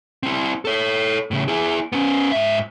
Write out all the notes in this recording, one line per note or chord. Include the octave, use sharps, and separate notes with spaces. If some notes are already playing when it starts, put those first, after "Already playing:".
C4 E4
A4 C#5
A2 C#3
E4 G#4
B3 C#4
G#2 E5